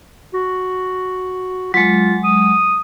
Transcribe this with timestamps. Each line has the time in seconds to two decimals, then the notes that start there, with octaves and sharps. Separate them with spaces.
0.34 F#4
1.74 F#3 G#3 F4
2.24 D#6